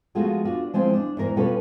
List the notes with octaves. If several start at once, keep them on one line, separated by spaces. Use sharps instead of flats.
F3 G#3 A3 B3 F4 F#4
D4 F4 F#4
F3 G#3 C4 E4
D4
E2 G#2 A#4 E5
B2 G3 C#4 F4 A4 B4